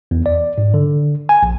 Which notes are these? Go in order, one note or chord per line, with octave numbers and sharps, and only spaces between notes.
E2
D5
G#2
D3
G#5
A#1